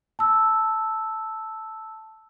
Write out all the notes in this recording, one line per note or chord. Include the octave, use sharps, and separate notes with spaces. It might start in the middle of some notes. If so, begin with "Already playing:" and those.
A5 E6